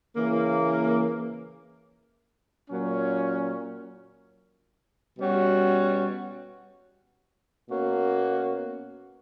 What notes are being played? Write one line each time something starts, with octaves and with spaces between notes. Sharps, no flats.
C#3 E3 A#3
A#2 F#3 C#4
B2 G3 C#4 F#4
B2 A#3 C#4 F#4